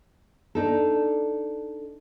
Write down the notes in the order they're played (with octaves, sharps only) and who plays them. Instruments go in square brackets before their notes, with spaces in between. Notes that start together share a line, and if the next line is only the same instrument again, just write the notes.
[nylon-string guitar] D4 D#4 A4